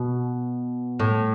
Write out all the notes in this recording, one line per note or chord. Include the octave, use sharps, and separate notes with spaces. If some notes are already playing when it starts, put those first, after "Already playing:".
Already playing: B2
A2